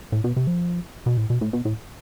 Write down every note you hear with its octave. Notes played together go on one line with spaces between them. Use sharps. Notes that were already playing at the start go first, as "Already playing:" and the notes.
A2
B2
C3
F3
B2
A2
B2
A2
B2
A2